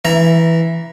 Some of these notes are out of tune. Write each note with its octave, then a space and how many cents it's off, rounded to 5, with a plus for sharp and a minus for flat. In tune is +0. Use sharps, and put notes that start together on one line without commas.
E3 +0 E5 +15 A#5 +15